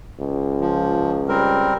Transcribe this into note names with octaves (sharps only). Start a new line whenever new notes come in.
C#2
F3
G3 C4 A#4